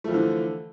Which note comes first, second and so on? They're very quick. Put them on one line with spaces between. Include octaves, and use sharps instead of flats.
A3 F3 E3 D3